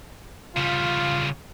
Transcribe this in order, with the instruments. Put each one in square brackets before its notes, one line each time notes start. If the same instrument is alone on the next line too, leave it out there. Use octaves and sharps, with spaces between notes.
[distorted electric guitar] C#3 G3 [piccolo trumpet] F4